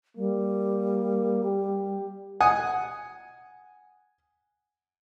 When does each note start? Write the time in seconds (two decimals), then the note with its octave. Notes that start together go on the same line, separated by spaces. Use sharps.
0.16 G3 A#3
1.44 G4
2.40 F#5 G#5 D#6